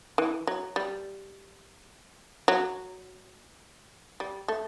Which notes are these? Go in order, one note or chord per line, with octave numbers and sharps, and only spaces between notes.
E3
F#3
G3
F#3
G3
A3